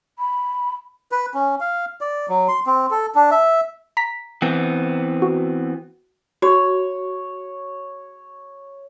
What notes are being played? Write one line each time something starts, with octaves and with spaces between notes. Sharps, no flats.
B5
B4
C#4
F5
D5
F#3
C6
C4
A4
D4
E5
A#5 B6
E3 B3 C4
F#4
F#4 C#5